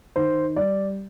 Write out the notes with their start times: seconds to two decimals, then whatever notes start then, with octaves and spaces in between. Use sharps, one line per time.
0.16 D#3 C5
0.56 G3 D5